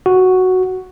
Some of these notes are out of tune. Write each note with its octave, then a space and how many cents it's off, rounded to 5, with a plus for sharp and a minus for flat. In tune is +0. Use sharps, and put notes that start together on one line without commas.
F#4 +0